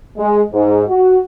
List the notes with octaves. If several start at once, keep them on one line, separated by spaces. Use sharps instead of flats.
G#3
G#2
F#4